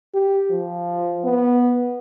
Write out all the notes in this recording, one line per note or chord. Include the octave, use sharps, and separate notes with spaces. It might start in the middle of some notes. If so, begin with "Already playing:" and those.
G4
F3
B3